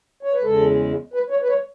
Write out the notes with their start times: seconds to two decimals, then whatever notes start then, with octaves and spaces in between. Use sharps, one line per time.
0.23 C#5
0.33 B4
0.42 E2 C#3 G#3 A4
1.14 B4
1.30 C#5
1.42 B4
1.49 C#5